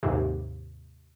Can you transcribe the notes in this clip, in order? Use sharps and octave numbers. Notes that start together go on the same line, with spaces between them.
D#2 G#2 C3